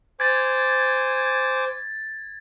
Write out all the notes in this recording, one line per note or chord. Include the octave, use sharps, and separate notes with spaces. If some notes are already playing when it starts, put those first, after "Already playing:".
C5 G#5 D6 G#6 A6